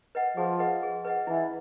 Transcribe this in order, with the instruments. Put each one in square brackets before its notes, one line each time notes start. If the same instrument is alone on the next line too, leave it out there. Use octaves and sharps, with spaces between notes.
[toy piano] B4 D#5 F#5
[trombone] F3 [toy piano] G#4
[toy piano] B4 D#5 F#5
G#4
B4 D#5 F#5
[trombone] E3 [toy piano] E4